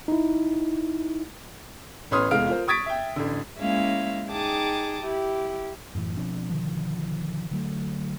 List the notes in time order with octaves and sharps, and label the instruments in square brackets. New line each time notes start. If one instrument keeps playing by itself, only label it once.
[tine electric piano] D#4 E4
[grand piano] A1 B4 C#5 C6 D#6 F6
F1 E2 G#3 F5 F6 D7
F4 A#4 C5
C#6 D#6 G#6 A6 B6 D7
E5 G5
A1 D3
[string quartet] G#3 A#3 C#4 E4 E5 F5
D#4 G#4 G5 A5 D6 D#6
E4 G4
[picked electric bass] F#2 A2 E3
B2 F3 C4 D4
B2 D3 D#3 F3
D3 F#3 A3